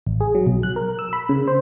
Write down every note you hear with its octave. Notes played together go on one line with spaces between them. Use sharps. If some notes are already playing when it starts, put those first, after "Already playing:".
A1
G#4
F#3
B1
F#6
A#4
E6
B5
C#3
C5